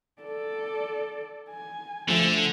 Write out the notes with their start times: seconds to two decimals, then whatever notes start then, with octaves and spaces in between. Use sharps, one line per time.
0.22 A4 D5
1.50 G#5
2.08 D3 F3 A3